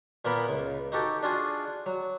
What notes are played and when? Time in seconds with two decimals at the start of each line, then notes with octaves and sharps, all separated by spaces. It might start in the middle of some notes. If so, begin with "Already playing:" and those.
0.25 A#2 A#3 B3 A#4 B5
0.49 C#2
0.92 D#4 F#4 G4 A4
1.23 D4 F4 F#4 G#4
1.86 F#3